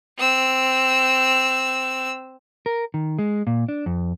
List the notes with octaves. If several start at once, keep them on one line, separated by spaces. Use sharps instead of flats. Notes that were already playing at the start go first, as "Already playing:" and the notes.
C4 E6
A#4
D#3
G#3
A#2
D4
F2